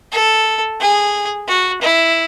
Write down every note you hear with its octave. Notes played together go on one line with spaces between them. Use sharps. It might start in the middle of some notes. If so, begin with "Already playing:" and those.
A4
G#4
F#4
E4